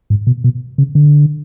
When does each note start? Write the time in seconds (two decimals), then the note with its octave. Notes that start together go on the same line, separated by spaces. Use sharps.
0.10 G#2
0.27 B2
0.44 B2
0.78 C#3
0.95 D3